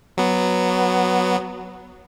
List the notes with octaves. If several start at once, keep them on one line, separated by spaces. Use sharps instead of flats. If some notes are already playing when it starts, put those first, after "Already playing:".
F#3 B3